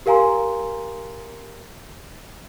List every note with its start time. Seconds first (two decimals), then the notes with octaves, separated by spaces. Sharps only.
0.06 G4 A#4 F5 G#5 A#5 C6